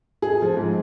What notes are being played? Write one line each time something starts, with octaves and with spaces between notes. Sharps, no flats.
G#4
F3
G#2